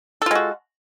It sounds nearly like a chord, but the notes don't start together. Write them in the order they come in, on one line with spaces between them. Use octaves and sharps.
A4 F4 G#3 F#4